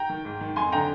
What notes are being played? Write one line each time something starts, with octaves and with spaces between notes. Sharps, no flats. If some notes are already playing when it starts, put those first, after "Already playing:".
Already playing: G5 A#5
D#3
G#2
D#3
F2 G#5 C6
D3 G5 A#5